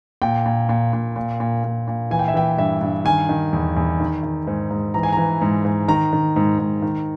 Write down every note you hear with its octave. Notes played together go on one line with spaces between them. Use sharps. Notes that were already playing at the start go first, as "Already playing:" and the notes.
A#2 G5
A#2
A#2
A#2
A#2
A#2
A#2
A#2
E3 G#5
G5
E5
E3 G5
G2 E5
G2
D#3 G#5
D#3
E2
E2
D#3
D#3
G#2
G#2
E3 A#5
G#5
E3 A#5
G#2
G#2
D#3 A#5
D#3
G#2
G#2
D#3